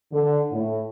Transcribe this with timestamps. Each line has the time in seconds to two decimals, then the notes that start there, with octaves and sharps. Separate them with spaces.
0.12 D3
0.52 A2